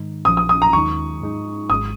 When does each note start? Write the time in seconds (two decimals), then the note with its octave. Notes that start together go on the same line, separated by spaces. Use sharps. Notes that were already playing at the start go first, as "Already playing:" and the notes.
Already playing: G#2 D#3 G#3 D#4
0.25 A#1 A#2 F3 D#6
0.37 D#6
0.49 D#6
0.62 A#5
0.73 D#2 D#3 G#3 D#4 C#6
1.21 G#2 G#3 D#4
1.70 G#1 G#2 G#3 D#6